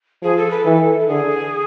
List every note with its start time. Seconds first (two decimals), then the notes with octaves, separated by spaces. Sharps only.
0.23 F3 G#4
0.37 A4
0.50 B4
0.65 E3 A4
0.99 A4
1.07 D3 G#4